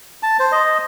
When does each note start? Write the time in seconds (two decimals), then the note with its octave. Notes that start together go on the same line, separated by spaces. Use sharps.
0.23 A5
0.40 C5
0.52 D#5